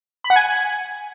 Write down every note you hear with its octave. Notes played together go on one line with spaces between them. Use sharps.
B5
F#5
G#5